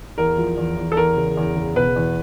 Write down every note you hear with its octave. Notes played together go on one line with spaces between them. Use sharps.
E2 A#4
F3
E2
E2
A4
E2 A#4
C#3
E2
C#3
B2 B4
E2